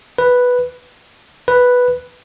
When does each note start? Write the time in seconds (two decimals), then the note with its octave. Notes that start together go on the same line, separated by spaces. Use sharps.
0.18 B4
1.48 B4